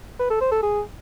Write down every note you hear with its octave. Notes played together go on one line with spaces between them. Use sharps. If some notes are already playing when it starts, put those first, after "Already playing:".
B4
A4
C5
A4
G#4